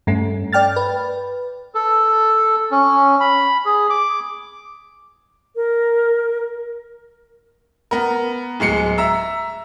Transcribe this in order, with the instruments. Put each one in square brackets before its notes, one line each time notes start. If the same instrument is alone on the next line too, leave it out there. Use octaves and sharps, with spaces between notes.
[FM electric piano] G2 A3 C#4
D5 G5 F6 A6
B4
[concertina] A4
C#4
B5
G#4
D6
[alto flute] A#4
[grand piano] B3 A#4
D1 G#3 C7 C#7
E5 A#5 E6